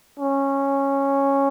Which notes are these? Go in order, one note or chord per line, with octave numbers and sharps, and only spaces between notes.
C#4